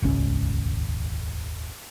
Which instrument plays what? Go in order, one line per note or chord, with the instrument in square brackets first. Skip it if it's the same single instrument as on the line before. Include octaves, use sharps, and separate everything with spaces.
[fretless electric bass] D#1 G#1 C#2 C#4